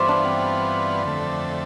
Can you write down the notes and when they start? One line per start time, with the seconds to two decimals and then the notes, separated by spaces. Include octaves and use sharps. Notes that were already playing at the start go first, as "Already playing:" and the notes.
Already playing: G2 E3 B3 F4 C5 D5
0.09 D4
0.25 C4
1.03 F2 D3 A3